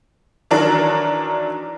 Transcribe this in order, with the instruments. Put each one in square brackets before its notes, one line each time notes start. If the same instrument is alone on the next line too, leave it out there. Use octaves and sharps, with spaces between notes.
[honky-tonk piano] D#3 E3 F#3 D4 A#4